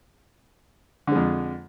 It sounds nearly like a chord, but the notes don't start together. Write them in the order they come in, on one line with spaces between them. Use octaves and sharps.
D3 G#3 F2